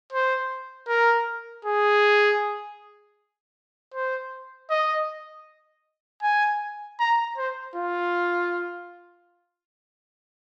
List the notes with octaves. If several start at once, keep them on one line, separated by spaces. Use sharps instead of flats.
C5
A#4
G#4
C5
D#5
G#5
A#5
C5
F4